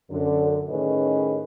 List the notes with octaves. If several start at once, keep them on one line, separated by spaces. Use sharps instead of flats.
F#2 D3
A2 D#3 C#4 G#4 B4 D#5